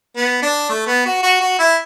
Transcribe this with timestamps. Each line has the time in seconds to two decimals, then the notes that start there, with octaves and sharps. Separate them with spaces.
0.17 B3
0.42 D4
0.69 A3
0.87 B3
1.05 F#4
1.23 F#4
1.41 F#4
1.59 E4